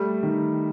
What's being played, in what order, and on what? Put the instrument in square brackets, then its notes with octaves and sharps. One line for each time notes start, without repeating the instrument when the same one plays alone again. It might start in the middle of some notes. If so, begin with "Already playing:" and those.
Already playing: [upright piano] G3 [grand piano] A3
[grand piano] D#3